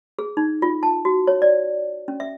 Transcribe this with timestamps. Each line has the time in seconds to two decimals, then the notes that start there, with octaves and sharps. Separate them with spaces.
0.19 G#4
0.37 D#4
0.62 F4
0.83 A5
1.05 F#4
1.27 C#5
1.42 D5
2.08 C#4
2.20 E5